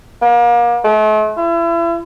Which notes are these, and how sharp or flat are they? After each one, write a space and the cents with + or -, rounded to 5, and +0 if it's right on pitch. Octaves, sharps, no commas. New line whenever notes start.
A#3 +35
A3 -40
E4 +35